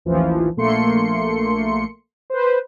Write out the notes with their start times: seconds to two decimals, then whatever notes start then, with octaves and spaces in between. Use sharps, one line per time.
0.05 A1 D#2 E3 F3
0.56 A#1 A3 A#3 C6 C#7
2.30 B4 C5